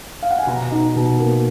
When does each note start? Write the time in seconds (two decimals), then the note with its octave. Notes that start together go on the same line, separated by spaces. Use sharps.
0.22 F5
0.31 F#5
0.39 G#5
0.47 B2 A#5
0.72 D#4
0.96 B2
1.20 A#3